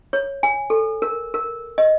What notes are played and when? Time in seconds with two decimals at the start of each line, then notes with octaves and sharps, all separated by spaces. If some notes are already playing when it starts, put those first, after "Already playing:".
0.13 C#5
0.43 G#5
0.70 A4
1.02 A#4
1.34 A#4
1.78 D#5